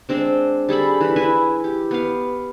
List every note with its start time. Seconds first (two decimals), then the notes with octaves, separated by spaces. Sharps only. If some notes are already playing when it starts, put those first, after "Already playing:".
0.09 G#3 C4 D4
0.69 G3 G#4 A4 B5
1.01 E3 B5
1.16 E4 B4 E5 G#5
1.64 G4
1.91 B3 F5